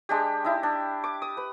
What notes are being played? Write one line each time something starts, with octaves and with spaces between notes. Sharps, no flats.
G#3 D4 G4
D#4 E4
D4
D6
D#6
B4